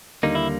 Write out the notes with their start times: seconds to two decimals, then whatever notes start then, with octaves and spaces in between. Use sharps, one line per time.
0.23 D#2 D3 G3 A#3 D#4
0.35 E4